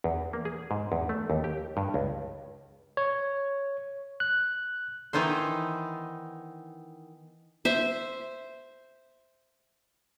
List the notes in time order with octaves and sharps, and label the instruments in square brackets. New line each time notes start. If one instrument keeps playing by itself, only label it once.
[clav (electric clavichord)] E2
A#3
G#4
G#2
E2
A3
D#2
G4
G2
C#2
[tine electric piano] C#5
F#6
[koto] D#3 E3 B3 D#4 C5
[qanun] C5 E5